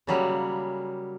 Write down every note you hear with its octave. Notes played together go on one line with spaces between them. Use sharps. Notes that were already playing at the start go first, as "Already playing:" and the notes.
C#3 F#3 G3 A#3